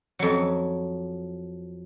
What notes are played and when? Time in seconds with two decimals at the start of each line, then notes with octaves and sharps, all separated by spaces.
0.19 F2 F#3